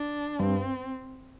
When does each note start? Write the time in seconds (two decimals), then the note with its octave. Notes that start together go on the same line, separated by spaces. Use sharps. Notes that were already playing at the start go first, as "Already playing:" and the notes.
Already playing: D4
0.39 G2 C4